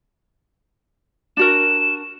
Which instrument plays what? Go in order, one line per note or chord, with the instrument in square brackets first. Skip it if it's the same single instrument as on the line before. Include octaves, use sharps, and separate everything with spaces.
[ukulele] D4 F#4 A#4 [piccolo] E7